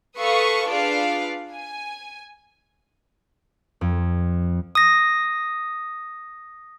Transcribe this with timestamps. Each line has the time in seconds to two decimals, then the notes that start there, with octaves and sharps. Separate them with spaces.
0.17 A4 B4 F5 C#6 D#6
0.67 D4 F4 G#4 B4 D5 F5
1.52 G#5
3.81 F2
4.75 D#6 A#6